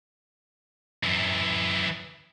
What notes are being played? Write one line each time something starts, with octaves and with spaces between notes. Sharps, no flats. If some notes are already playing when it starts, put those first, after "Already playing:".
F#2 E3